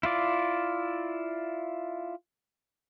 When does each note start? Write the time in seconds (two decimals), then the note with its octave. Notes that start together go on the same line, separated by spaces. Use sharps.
0.03 E4 F4 D5